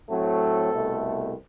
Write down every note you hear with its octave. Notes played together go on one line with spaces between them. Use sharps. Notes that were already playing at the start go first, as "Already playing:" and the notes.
A2 F#3 A3 C4 A4
C2 B2 A3